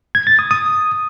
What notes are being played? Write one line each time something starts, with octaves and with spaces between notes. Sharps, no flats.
G#6
A6
D#6
D#6